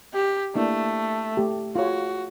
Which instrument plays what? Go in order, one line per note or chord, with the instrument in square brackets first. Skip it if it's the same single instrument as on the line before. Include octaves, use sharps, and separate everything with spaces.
[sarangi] G4
[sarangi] A3 [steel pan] A#3 D4 E4
[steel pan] A3 G4
[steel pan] F4 G#4 C#5 [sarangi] F#4